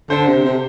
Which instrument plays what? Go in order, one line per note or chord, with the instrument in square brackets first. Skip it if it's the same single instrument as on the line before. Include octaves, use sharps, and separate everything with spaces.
[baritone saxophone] D3 [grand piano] C5
[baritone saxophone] C3
C3